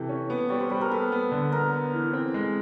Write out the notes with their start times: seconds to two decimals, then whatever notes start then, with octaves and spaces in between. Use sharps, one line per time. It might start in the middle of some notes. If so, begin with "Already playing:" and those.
Already playing: C3 E3 A4
0.09 C#4
0.30 B3
0.49 G3 C#5
0.60 C5
0.70 G3 B4
0.81 A#4
0.91 B3 A4
1.12 B3
1.32 D3
1.52 B3 A#4
1.73 B3
1.93 E3
2.13 C4
2.34 G#3